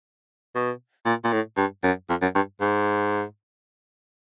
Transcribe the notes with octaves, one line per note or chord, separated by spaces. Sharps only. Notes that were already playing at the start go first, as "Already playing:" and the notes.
B2
A#2
A#2
A2
G2
F#2
F2
F#2
G2
G#2